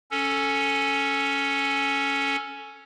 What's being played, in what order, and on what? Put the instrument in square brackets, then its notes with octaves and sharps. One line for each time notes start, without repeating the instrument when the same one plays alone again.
[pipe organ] C#4 A4